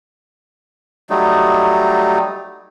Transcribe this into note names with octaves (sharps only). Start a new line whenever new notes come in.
F#3 G3 A3 D#4